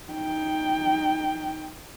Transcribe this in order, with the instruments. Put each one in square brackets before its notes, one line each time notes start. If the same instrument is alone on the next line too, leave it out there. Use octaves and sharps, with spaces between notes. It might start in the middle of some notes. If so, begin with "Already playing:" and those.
[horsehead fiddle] D#4 G5